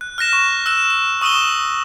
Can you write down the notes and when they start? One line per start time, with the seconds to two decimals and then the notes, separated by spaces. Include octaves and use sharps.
0.01 F#6
0.18 F6 F#6 A#6 E7
0.33 C#6
0.66 E6 F#6 E7
0.90 E7
1.22 C#6 D#6 E6 D#7 E7 G7